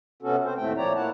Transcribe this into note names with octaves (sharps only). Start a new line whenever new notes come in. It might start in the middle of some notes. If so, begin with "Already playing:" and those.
C3 B3 C#4 F#4 A4
C4 C5
D#2 A2 A3 C4 G5
A#2 F3 C#5 D5 A#5
A2 A#3 E4 F#5 A5